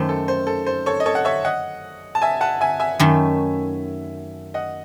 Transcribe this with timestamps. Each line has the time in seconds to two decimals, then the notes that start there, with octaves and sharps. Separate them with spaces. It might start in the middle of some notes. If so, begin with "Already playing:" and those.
Already playing: F#2 D#3 A3 C5
0.09 A4
0.28 C5
0.47 A4
0.66 C5
0.86 A4 C#5
1.00 D#5
1.06 A4 C#5
1.15 F#5
1.25 C#5 E5
1.45 D#5 F#5
2.15 A5
2.22 E5 G#5
2.41 F#5 A5
2.61 E5 G#5
2.80 E5 G#5
2.99 F#2 D#3 A3 C#4
4.54 D#5 F#5